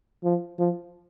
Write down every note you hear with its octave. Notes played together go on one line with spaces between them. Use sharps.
F3
F3